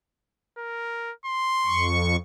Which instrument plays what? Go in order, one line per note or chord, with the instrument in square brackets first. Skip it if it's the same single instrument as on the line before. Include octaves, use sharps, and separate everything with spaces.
[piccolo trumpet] A#4
C6
[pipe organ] F2 C#6